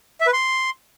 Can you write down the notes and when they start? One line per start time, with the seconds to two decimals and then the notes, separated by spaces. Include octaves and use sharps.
0.21 E5
0.27 B4
0.33 C6